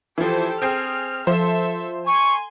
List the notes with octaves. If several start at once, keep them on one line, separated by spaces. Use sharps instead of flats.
E3 F3 G4 A4 C5
C4 G#4 G5 F6
F3 A4 C5 E5
G#5 C6 C#6